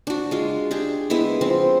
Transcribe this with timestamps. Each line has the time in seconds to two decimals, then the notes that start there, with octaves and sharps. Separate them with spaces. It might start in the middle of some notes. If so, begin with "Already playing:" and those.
0.07 D4 F#4
0.31 G#3 F4
0.71 D4 G4 G#4
1.10 G#3 B3 E4 E5
1.41 F3 C4